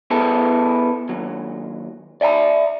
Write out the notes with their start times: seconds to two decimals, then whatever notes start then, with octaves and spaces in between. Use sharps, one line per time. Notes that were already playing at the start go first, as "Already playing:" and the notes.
0.10 B3 E4 G#4 A4 B4 C5
1.09 D#2 F#3
2.21 D5 E5 G5 A#5